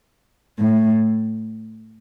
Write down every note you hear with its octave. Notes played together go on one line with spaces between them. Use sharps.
A2